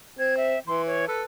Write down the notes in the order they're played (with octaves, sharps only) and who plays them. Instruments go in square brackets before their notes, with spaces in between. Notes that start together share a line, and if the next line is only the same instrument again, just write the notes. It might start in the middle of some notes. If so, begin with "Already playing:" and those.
[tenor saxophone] C4 [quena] G#6
[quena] E5
[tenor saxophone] E3 [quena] C6
[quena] C#5
[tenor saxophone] A4 [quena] B4